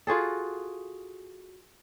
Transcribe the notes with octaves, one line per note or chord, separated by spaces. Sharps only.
F4 F#4 G#4 A4